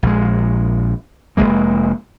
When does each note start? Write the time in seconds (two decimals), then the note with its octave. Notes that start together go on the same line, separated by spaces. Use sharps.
0.03 A#1 G#3
1.37 F1 G2 G#3 A#3